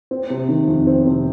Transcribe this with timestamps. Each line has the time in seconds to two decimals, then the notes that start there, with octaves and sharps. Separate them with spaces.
0.11 C4
0.30 C3
0.48 D#3
0.68 F2
0.87 C4
1.06 C3